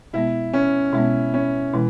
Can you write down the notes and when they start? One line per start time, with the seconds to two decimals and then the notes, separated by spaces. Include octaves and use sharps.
0.13 B2 G#3 B3 E4
0.53 C#4
0.93 B2 G#3 B3 E4
1.34 C#4
1.73 B2 E3 G#3